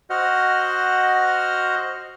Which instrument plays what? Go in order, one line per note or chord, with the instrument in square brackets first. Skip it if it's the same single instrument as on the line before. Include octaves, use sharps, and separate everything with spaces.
[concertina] F#4 C5 D#5 F#5 F6